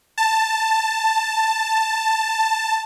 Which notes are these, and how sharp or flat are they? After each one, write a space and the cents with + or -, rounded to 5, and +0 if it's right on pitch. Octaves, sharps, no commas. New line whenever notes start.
A5 +10